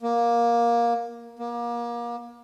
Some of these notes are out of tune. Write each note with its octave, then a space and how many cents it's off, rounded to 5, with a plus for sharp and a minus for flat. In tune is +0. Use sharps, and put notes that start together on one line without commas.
A#3 +15
A#3 +30